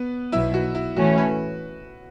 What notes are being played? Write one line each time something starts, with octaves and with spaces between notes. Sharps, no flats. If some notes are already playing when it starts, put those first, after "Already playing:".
Already playing: B3 B4
B1 B2 F#3 E4 E5
F#4
E4
A2 E3 A3 C#4 E4 F#4
B4